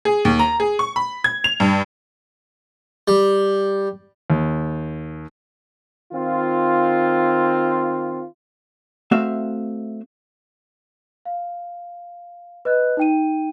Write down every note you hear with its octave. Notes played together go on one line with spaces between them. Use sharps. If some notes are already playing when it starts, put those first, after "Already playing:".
G#4
D#2
A#5
G#4
C#6
B5
G#6
F7
G2
G3
D#2
D#3 C4 F4
A3 C4 F#4 E5 F5
F5
B4 D#5 F#6
D#4 G5 D#7